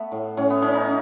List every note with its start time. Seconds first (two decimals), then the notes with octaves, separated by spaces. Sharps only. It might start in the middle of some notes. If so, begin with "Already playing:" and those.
Already playing: A3 B3
0.12 A2
0.37 A2 C#4
0.50 B3
0.62 E3 C#4
0.75 D#4